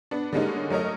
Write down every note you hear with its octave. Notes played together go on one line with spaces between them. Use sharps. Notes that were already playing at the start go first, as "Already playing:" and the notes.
B3 D4
D3 G3 G#3 A#3 C#4 D#4
F#3 A3 A#4 C#5 D#5